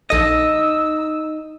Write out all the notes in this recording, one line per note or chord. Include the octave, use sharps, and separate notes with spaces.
A#1 D#4 A4 D#5 E6 C#7